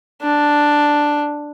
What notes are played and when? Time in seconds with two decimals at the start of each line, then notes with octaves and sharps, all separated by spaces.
0.22 D4